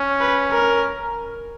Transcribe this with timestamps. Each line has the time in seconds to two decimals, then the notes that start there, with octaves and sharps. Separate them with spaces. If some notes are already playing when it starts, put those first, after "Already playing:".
Already playing: C#4
0.21 B4
0.52 A#4